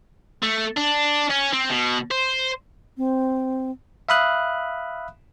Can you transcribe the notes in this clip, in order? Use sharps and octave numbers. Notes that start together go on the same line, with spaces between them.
A3
D4
C#4
C4
B2
C5
C4
E5 F5 B5 D#6 F#6